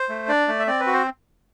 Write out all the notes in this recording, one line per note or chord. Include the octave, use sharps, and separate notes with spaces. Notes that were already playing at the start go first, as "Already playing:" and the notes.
Already playing: C5
A3
D4 D5
A3
E5
C4 D5
B4
F#4
C5